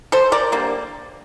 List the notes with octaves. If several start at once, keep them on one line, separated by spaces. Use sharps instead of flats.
A4 C5
A#4 D5
D3 G3 A#3